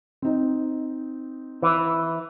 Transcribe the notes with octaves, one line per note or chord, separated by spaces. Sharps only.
C4 D#4
E3